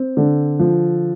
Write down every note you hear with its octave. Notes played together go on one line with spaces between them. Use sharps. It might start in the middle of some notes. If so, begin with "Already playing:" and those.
Already playing: C4
D3
F3